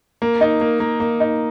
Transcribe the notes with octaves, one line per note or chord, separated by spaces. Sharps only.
A#3
D#4
A#3
A#3
A#3
D#4